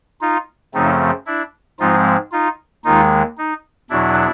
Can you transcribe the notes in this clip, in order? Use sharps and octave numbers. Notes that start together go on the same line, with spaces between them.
D#4 F4
F#2 C#3 F3 A3 C4 D#4
D4 E4
G#2 F3 G#3 C4 D#4 F4
D#4 F4
D#2 D#3 G#3 D#4 F4
D#4
E2 B2 F#3 D4 E4